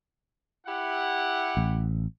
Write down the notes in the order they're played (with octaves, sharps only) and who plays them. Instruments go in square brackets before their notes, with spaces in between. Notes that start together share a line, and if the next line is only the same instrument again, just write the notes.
[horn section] E4 G4 F#5
[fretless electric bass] A1